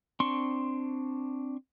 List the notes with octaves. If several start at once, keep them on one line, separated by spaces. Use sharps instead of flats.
C4 D4 C6 C#6